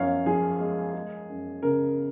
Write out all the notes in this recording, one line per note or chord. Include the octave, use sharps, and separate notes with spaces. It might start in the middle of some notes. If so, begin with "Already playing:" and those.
Already playing: F#2 F3 C#5 F5
F3 G#4
G#3
G#3
F#2
C#3 A#4